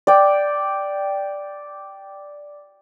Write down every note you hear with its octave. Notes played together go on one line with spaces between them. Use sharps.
D5 G5